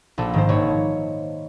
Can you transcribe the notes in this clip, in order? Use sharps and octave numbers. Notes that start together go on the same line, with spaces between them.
A#1 A4
G#2 D#3 C5
A#1 C#5